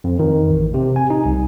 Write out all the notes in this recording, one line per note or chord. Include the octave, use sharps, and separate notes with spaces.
F2
D#3
A1
C3
G#5
D#4
C2